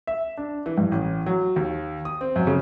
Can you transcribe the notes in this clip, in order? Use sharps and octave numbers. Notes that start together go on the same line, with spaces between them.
E5
D4
E3
G2
A1
F#3
D#2
D#6
C4
F#2
C#3